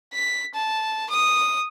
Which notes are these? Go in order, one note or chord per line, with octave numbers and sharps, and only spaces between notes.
B6
A5
D#6